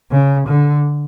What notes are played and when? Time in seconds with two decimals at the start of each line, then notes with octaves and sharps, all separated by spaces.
0.11 C#3
0.47 D3